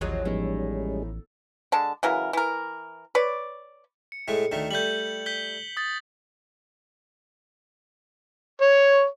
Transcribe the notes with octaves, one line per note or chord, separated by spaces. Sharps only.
A1 D#2 F3 F#3 G#4 C#5 D#5
A2 F3 G3 G#3 B3 C#4 D#4
D3 G#3 A5
C#3 E3 F#3 A#4
E3 A#4
B4 C#5 D5
C#7
A2 G#3 A3
D2 D#3 A3
G3 A3 G6 F#7
G6 B6 G7
D#6 A6
C#5